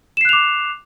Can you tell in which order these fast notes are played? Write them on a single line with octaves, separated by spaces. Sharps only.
E7 C7 F#6 F7 D6